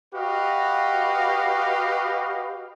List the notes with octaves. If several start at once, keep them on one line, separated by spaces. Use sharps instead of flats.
F#4 G4 B4 D#5 F5